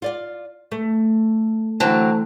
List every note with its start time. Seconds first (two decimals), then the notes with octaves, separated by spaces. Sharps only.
0.02 F4 D5 F5
0.72 A3
1.80 D3 E3 F#3 A3 C4